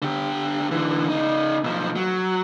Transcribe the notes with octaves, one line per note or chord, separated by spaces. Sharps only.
D3 G4
D3 E3
C#3 D#4
B1 F3
F#3